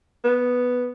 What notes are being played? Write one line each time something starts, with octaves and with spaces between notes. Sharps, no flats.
B3